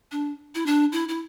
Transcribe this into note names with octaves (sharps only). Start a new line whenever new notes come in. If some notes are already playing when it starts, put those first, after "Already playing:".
D4
E4
D4
E4
E4